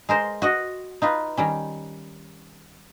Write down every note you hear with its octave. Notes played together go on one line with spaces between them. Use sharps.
G#3 A#4 C5
F#4 D#5 F#5
D#4 F4 B4
D#3 G3 C#4